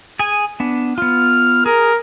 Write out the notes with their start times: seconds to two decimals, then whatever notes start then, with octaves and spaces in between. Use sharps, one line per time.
0.19 G#4 G#5
0.60 B3 D4
0.98 B3 F4 F6
1.66 G#4 A#4